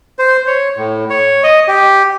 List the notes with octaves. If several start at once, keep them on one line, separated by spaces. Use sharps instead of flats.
C5
C#5
A2
C#5
D#5
G4